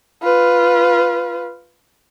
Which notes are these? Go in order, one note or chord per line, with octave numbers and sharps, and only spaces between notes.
F4 B4